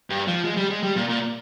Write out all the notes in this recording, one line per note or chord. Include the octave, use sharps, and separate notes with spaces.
G2
F3
G#3
G3
G#3
G3
A#2
A#2